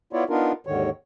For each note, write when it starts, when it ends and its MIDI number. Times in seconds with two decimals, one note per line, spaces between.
0.13 0.24 59
0.13 0.24 64
0.13 0.24 65
0.13 0.24 73
0.13 0.24 74
0.29 0.52 59
0.29 0.52 62
0.29 0.52 63
0.29 0.52 65
0.29 0.52 70
0.67 0.90 39
0.67 0.90 44
0.67 0.90 50
0.67 0.90 51
0.67 0.90 73